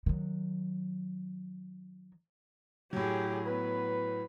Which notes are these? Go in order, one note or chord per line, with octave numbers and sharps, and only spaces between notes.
D#3 F#3
A2 F#3 G4 G#4
B3 B4